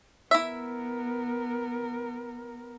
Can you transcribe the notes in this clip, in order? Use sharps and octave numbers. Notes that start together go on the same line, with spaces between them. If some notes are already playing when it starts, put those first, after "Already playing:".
B3 E4 A#4 E5